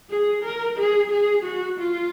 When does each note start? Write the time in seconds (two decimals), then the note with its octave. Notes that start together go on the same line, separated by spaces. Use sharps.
0.10 G#4
0.43 A#4
0.77 G#4
1.11 G#4
1.44 F#4
1.77 F4